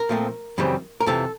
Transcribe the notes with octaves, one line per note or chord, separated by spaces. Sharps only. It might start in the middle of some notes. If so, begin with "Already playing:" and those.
Already playing: A#4
A#2 F3 A3 C4
F#2 C#3 E3 G3 C4
A#4
F2 C3 E3 A4